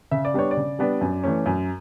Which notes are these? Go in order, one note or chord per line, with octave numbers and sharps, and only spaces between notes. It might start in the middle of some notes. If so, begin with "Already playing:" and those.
C#3 E5
D5
G3 B3 D4 C#5
D5
C#3
G3 B3 D4
F#2
E3 A3 C#4
F#2